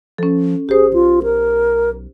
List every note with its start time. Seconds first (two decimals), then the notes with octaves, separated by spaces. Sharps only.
0.18 F3 C#4 A4
0.69 G1 G4 G#4 C5
0.93 B1 F4
1.23 A#4